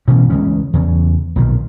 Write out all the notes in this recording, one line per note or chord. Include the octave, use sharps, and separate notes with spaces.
A1 B2 E3 C#4
C#2 E3 G#3 C#4
E2 C#3
B1 A#2 D#3